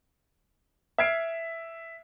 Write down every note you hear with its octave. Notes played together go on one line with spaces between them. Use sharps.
E5 F6 G#6 B6 C7 D7